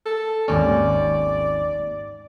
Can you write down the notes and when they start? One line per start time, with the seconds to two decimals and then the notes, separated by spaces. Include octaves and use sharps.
0.06 A4
0.48 G#1 D#2 C#4 D5